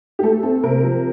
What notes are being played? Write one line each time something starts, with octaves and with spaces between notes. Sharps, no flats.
G4
A3 A4
C4 A4
C3 A#4
F3